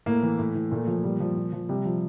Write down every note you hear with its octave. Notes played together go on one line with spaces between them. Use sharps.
A2 A#3
E3
A2
E3
A#2 A3
F3
A#2 G3
F3
A#2
F3
C3 G3
F3